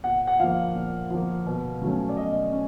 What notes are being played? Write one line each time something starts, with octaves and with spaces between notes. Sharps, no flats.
A#2 F#5
F#5
F3 A#3 F5
A#2
F3 A#3
B2
F#3 A3 C#4
D5
B2 D#5
C#4